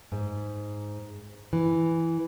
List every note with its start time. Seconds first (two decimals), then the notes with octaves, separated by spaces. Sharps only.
0.12 G#2
1.53 E3